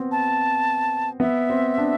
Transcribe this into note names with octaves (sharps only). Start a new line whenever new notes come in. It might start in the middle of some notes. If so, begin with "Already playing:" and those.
Already playing: B3 C4
A5
B3 E5
C4
D4